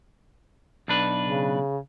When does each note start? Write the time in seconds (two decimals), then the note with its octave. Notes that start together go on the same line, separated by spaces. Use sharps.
0.88 B1 D4 B4
1.22 C#3